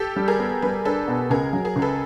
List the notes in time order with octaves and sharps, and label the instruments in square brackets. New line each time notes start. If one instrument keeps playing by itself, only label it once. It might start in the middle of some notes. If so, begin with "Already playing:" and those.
Already playing: [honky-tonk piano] G4 A4
[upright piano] G3
[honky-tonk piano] G#4 A#4
[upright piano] B3
[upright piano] G3 [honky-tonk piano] B4
[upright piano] D4 [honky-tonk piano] A4 B4
[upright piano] B2
[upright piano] C#2 [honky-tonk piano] G#4 A#4
[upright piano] F#3
[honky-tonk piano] G#4 A#4
[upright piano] C#2
[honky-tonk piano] A4 B4